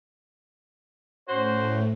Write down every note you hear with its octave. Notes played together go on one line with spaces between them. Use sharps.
A2 A3 C#4 F#4 C5